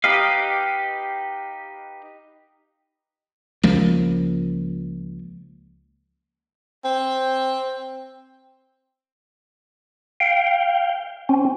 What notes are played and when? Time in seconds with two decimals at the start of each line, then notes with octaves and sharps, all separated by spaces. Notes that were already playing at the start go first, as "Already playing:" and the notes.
0.04 D#4 G4 B4 D#5 F5
3.63 C#2 F3 A#3
6.85 C4
10.20 F5 G5
11.29 C4 C#4